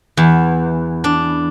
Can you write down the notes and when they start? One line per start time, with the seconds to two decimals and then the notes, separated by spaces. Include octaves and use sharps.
0.17 E2
1.04 D4